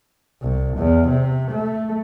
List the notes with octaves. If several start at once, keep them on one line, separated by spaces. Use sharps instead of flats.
C2
E2
C3
A3